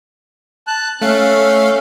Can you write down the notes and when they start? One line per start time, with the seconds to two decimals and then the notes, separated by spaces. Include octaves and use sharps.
0.67 A5 F#6
1.02 A3 C#4 F5